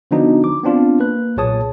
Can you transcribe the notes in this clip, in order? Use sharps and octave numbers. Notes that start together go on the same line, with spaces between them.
D3 F3 B3 D4 D#4 F#4
D6
B3 C4 D4 F4
A#3 B4 F#6
B1 A#2 G#4 C#5 A5 D#6